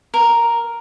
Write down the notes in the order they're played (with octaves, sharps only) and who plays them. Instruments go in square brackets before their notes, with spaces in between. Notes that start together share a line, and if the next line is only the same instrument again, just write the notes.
[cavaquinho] A#4